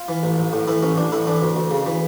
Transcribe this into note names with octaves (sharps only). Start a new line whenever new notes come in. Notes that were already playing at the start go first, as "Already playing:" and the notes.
Already playing: F4
E3
A1
A1
A2
E3 E4
A1 C#4
A1 D4
A2 E4
E3 D4
D2
D2
C#3
E3